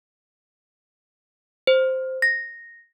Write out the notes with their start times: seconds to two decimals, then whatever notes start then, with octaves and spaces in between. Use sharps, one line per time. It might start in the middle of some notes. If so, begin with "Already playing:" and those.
1.67 C5
2.22 A#6